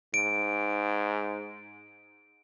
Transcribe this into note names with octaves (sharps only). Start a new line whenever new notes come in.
G#2 D7